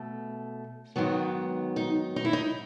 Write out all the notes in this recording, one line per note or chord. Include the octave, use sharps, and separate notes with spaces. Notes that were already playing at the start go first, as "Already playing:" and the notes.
Already playing: B2 A3
G#2 D#3 F#3 B3
D#4
D#4
E4
D#4